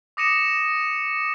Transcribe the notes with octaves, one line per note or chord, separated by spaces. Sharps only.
D6 D#6 A#6 C#7 D#7 E7